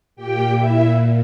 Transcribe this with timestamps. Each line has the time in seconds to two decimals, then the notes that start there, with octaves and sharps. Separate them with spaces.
0.16 A#2 G4 G5
0.55 E4 E5